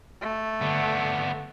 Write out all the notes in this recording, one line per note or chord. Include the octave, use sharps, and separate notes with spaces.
A3
D3 B3